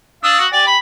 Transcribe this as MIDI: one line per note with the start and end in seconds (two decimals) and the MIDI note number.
0.24 0.34 62
0.24 0.42 77
0.24 0.42 87
0.24 0.42 88
0.39 0.47 66
0.52 0.75 67
0.52 0.66 74
0.52 0.75 80
0.67 0.78 83